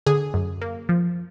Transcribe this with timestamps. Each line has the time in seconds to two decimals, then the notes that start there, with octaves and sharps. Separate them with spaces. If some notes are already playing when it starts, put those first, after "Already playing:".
0.06 D3 G#4
0.34 F#2
0.62 A#3
0.89 F3